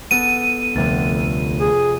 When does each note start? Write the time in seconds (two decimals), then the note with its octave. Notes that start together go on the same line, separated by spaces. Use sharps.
0.11 B3 A4 D#7
0.76 F1 D2 A6
1.61 G#4